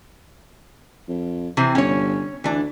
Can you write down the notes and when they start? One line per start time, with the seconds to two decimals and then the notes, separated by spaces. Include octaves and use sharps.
1.08 F2
1.57 C3 E3 C4
1.75 G1 C#4 C#5
2.44 D2 E3 D4